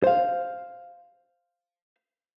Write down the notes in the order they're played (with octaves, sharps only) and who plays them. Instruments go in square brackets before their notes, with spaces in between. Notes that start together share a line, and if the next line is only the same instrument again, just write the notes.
[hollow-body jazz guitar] C5 F5